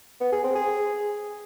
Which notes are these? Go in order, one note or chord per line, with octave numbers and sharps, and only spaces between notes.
B3
G#4
C4
G#4